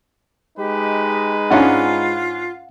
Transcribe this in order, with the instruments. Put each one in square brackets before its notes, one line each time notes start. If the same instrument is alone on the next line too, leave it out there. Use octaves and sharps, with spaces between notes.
[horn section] G#3 D#4 B4 [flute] G4
[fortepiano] G#2 C#4 D4 [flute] F4 [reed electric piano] F5 F#5